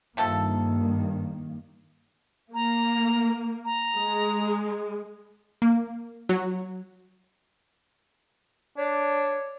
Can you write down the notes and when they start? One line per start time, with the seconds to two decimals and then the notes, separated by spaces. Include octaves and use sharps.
0.17 G2 C3 D#3 F3 A#3 A4
2.54 A#3 A#5
3.65 A#5
3.95 G#3
5.62 A#3
6.29 F#3
8.78 D4 C#5